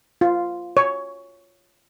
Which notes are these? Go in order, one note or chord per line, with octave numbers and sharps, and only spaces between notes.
F4
C#5